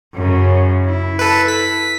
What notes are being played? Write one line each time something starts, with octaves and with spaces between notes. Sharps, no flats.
F#2 C#3
E4
A4 B4
B6